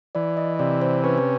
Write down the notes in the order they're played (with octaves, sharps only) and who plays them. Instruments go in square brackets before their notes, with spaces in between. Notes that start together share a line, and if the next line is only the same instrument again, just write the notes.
[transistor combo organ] E3 [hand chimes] D5
[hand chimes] D#5
[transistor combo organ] C3 [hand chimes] D5
[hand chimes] C5
[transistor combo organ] C#4 [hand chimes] B4
[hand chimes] C#5